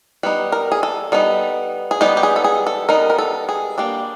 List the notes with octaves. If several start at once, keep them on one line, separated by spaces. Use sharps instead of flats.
G3 B3 D#4 B4
A#4
G#4
A4
G3 B3 D#4
G#4
G3 B3 D#4 G4
G4
G#4
A4
G#4
A4
G3 B3 D#4 A#4
A#4
A4
G#4
G3 A#3 D4 G4